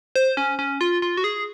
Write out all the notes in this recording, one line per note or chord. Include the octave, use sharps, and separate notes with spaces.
C5
C#4
C#4
F4
F4
F#4
G#4